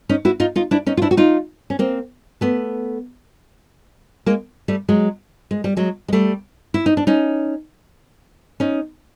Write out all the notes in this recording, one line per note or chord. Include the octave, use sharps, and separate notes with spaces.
C#4 D#4
E4 F#4
D#4 F4
D#4 F4
D4 E4
C#4 D#4
F4
D4 E4
F#4
D#4 F4
C#4
A#3 C4
A3 B3
G#3 A#3
G3 A3
F#3 G#3
G#3
G3
F#3 G#3
G#3
G3 A3
E4
D#4
D4
C#4 D#4
C#4 D#4